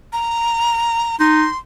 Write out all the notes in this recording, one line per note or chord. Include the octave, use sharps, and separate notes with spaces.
A#5
D#4 C6